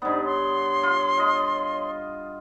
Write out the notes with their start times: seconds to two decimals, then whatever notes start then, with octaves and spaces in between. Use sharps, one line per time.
0.02 G2 B3 D#4 C5 D5
0.24 C#5 C6
0.83 F4
1.17 F4 D#5